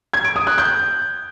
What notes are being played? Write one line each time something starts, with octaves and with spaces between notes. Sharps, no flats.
G#6
D7
D#6
F#6
G6